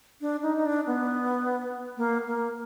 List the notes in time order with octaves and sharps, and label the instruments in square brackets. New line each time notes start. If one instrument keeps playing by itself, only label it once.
[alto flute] D4
D#4
D#4
D4
B3
A#3
A#3